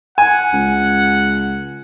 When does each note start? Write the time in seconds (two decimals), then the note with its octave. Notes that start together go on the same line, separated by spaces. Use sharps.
0.18 F#5 G#5
0.53 C#2